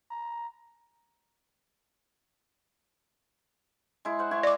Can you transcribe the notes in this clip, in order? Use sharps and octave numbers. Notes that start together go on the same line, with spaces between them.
A#5
G#3 E4
C5 F#5
E4 G#5 C#6
D5 D6